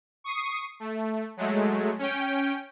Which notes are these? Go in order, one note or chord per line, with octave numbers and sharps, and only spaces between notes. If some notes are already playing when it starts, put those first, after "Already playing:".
C#6 D#6 C7
A3
F#3 G#3 A3
C#4 G5